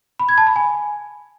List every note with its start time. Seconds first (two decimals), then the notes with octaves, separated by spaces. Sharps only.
0.19 B5
0.29 G#6
0.38 A5
0.47 B5
0.56 G#5